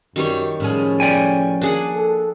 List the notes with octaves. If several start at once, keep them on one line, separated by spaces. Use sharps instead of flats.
F#2 D#3 G3 C#5
A2 F3 C#4 G#4
D5 G5 G#5
A#3 D4 G#4 F#5
A4